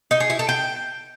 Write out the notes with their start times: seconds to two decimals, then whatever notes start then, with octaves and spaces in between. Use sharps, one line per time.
0.11 D#4
0.20 G#4
0.30 E4
0.39 A4
0.49 G5